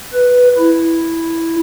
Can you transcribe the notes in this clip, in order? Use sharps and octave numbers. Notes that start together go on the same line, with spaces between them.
B4
E4